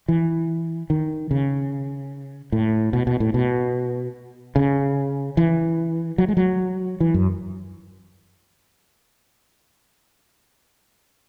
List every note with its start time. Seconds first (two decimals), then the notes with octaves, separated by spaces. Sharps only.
0.08 E3
0.90 D#3
1.31 C#3
2.52 A2
2.93 B2
3.07 B2
3.20 A2
3.34 B2
4.56 C#3
5.37 E3
6.18 F#3
6.28 G#3
6.37 F#3
7.00 E3
7.14 F#2